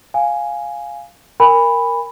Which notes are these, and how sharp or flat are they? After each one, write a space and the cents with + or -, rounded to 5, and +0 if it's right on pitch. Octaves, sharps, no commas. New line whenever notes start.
F5 +0 G#5 +0
A#4 +0 G#5 -35 B5 +0